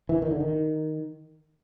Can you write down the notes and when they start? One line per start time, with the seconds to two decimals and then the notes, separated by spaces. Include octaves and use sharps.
0.09 E3
0.22 D#3
0.31 D3
0.40 D#3